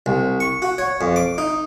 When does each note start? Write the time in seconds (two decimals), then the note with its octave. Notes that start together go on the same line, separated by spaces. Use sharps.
0.06 C2
0.40 C#6
0.62 F#4
0.78 C#5
1.01 F2
1.16 D6
1.38 D#4